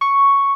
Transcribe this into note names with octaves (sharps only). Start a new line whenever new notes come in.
C#6